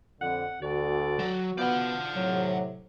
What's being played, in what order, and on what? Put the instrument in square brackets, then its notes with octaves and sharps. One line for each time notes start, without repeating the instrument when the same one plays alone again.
[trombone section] F2 D3 [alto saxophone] F#5
[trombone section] D2 D3 [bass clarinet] F#4 [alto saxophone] D5
[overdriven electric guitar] F#3
[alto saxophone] F3 [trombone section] B3 [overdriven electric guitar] D5 F#5
[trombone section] A2 C3 [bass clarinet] F#3